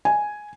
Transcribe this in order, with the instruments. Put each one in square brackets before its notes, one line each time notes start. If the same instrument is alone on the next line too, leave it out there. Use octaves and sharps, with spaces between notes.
[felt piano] G#5